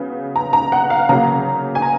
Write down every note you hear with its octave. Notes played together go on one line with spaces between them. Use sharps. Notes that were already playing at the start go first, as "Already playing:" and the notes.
Already playing: C#3 F#3 B3
A#5
A#5
F#5
F5
C#3 F#3 A#3 A#5
G#5
A#5